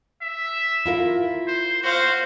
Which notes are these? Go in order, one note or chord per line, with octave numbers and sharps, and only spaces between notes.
E5
E4 F4 A#4
C5
F#4 C5 F5